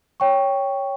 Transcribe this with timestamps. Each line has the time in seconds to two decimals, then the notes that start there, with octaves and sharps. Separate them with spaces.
0.20 C#5 G5 C#6